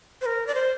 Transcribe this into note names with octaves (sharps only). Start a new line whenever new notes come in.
C5
A#4
D5
C5